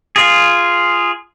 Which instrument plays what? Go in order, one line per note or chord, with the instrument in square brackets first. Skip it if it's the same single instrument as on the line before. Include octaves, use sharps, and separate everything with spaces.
[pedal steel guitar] F4 G#4